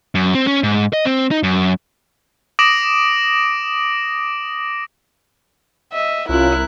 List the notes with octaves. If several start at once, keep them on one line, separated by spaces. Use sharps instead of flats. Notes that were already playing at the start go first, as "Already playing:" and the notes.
F#2
C4
C#4
G#2
D#5
C4
D#4
F#2
D6 D#6 A#6 D7 E7 F#7
D#5 E5
C2 C#4 E4 F4 A#4 F#6